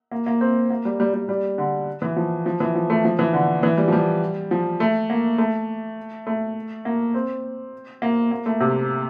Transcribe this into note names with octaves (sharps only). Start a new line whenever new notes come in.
A#3
A#3
C4
A#3
G3
G3
G3
G3
D3
E3
F3
F3
E3
F3
A3
F3
E3
D3
E3
G3
F3
G3
F3
A3
A#3
A3
A3
A#3
C4
A#3
A#3
A3
C3